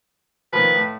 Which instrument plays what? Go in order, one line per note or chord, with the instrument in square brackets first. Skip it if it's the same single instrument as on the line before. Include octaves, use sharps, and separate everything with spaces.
[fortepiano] A#2 D#3 F3 [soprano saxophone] B4
[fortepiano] A2